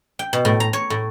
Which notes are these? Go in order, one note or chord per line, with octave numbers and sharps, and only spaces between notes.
G5
B2
A2
A#5
C#5
A2